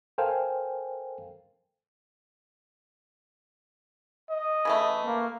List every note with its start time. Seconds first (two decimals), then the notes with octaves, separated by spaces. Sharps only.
0.18 A4 A#4 C5 F5 G5 G#5
4.30 D#5
4.65 C#3 E3 A3
5.05 A#3